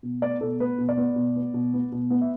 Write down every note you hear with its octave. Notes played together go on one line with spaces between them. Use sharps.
B2
B3 D5
B2 A4
B3 B4
B2
D5
B3
B2
B3
B2
B3
B2
B3
E5